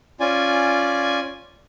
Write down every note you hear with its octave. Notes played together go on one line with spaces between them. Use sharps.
C#4 F4 D5 G#5